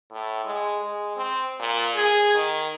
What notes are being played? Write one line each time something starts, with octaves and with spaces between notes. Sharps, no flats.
A2
G#3
G#3
C4
A#2
G#4
D#3